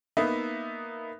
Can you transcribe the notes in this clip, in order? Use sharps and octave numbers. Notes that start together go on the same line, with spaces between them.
A#3 B3 D#4 E5